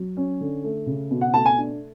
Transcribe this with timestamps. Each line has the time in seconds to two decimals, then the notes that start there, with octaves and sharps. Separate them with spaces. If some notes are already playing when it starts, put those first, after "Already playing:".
Already playing: F#3
0.17 C#4
0.41 D3
0.64 A3
0.86 C#3
1.11 B2
1.21 F#5
1.34 A3 A5
1.46 G#5
1.58 D4